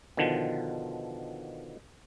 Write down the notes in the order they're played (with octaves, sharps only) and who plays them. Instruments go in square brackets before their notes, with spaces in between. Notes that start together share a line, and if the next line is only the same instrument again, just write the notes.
[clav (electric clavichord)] B2 D3 D#3 F3